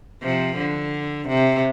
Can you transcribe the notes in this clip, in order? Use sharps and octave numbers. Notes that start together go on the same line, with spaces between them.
C3 F3
D3
C3